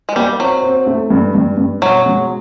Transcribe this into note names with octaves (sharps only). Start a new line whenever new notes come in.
G#3
G3 A#3
F#3 C4
C4
A3
G2
G2
G2
B2 F#3
G#3